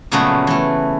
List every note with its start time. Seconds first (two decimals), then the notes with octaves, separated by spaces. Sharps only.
0.12 A#2 C#3 F3 F#3 A3 B3
0.47 E3 A3